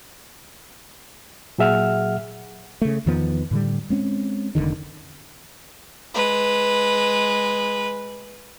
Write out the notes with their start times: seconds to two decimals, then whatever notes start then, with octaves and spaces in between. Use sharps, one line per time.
1.58 A#2 F#3 G#4 E5 F#5 F6
2.82 C#3 A3
3.06 E2 D#3 F3 B3
3.51 A2 D3 G3
3.90 G#3 C4 C#4
4.55 F1 D#2 D3 D#3
6.14 G#3 B4